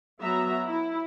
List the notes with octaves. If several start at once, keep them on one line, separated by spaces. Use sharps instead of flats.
F#3 B3 E5 A#5
E4